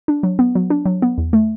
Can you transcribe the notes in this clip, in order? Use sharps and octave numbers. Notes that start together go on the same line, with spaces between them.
D4
F#3
B3
F#3
D4
F#3
B3
E2
A3